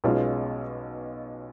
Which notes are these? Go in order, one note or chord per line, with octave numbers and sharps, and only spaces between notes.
B1 B2 G#3 C#4 F4